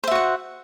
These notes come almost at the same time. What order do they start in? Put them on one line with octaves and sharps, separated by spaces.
C5 E5 F#4 F#5